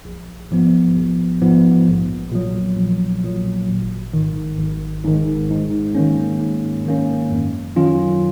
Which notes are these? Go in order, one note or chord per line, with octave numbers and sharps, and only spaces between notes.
A#1
G#2 F3 B3
A#1
G#2 F3 B3
A#1
A#2 F#3
A#1
A#2 F#3
G#1
G#2 D#3
G#1
G#2 D#3
G#2
D#3 A#3 C#4
G#2
D#3 A#3 C#4
F#2
D#3 F#3 C#4 F4